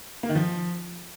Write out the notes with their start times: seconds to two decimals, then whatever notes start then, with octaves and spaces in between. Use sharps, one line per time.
0.23 A#3
0.29 D#3
0.35 F3